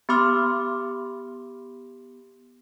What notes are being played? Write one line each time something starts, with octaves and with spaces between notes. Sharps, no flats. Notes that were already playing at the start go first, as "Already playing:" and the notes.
B3 G4 B5 C6 D6 F6